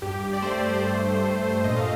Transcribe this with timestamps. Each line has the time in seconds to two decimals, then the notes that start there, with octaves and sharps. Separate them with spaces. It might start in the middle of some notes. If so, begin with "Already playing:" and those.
0.02 G2 G4
0.33 D5
0.42 A3 C5
0.83 G2
1.24 A3
1.64 A#2 D#5
1.76 F5